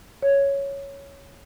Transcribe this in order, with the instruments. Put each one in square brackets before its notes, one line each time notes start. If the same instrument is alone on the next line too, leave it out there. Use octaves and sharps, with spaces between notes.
[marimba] C#5